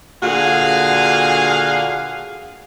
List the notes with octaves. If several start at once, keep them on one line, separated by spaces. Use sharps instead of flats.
A#2 D3 F#4 G#4 F5 G#5